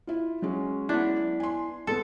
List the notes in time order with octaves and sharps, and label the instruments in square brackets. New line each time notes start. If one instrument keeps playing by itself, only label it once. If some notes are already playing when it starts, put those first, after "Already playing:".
[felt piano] E4 F4
F#3 G#3 C#4
[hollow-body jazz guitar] B3 E4 [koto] D4
[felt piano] G#5 C6
[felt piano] G#3 B3 [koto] A4